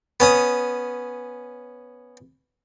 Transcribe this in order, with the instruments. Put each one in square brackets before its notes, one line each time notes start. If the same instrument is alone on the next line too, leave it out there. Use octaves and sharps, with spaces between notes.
[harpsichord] B3 C#4 D#6